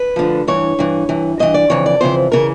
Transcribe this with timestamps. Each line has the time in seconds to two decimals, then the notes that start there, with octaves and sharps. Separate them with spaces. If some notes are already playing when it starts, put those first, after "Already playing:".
Already playing: B4
0.16 D2 D3 F3
0.47 G2 E3 C#5
0.79 G2 E3
1.09 G2 E3
1.39 G2 E3 D#5
1.54 D5
1.70 F2 C#3 E3 C#5
1.86 D5
2.01 F2 C#3 E3 C5
2.32 C#3 E3 A#4